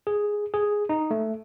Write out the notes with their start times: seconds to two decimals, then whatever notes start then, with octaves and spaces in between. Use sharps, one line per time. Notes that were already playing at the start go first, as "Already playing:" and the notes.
0.07 G#4
0.54 G#4
0.89 D#4
1.11 A3